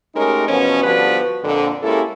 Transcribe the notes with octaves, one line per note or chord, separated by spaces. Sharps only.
G#3 A3 C#4 D#4 G4 A#4
E2 B2 F3 B3 C#4
D3 F3 G3 B3 F#4 B4
F2 A#2 D3
G#3 A#3 C#4 E4 G4 A4